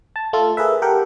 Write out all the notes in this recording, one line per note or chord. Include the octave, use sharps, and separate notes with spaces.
A5
A3 F4 A4
G#4 A#4 B4 E5
G4 A4 A#4 F#5 G5